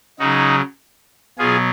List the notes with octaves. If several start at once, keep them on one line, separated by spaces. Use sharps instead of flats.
C#3 F#3 D#4 F#4
B2 F#3 F4 G#4